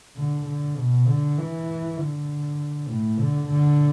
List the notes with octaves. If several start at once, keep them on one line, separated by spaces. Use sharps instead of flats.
D3
D3
B2
D3
E3
D3
A2
D3
D3